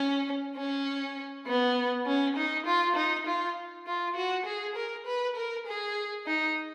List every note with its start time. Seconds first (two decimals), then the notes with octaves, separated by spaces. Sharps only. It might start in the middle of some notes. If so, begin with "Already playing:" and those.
Already playing: C#4
0.57 C#4
1.46 B3
2.06 C#4
2.36 D#4
2.66 F4
2.96 D#4
3.26 F4
3.87 F4
4.16 F#4
4.46 G#4
4.75 A#4
5.06 B4
5.36 A#4
5.67 G#4
6.26 D#4